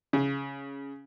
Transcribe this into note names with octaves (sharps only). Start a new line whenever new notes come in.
C#3